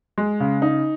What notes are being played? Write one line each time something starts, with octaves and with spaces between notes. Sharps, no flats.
G#3
C#3
D#4